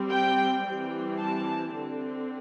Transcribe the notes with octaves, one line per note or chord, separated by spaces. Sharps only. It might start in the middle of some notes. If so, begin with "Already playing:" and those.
Already playing: G3 C4
G5
E3 G3 C4
A5
D3 C4